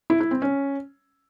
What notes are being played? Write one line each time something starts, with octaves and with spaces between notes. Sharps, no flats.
E4
E4
C4
C#4